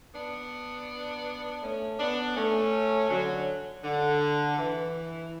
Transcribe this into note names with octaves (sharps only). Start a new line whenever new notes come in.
B3 D4
A3 C#4
B3 D4
A3 C#4
D3 F#3
D3
E3